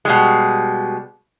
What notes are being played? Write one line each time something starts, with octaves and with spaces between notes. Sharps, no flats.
B2 G3 G#3